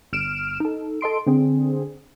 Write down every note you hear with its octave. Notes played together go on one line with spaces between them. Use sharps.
G1 F6 D7 E7
D#4 A4
A4 D#5 C6 D7
D3 C4 G#4